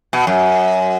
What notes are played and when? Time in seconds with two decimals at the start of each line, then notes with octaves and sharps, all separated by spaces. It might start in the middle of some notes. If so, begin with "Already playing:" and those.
0.13 B2
0.27 F#2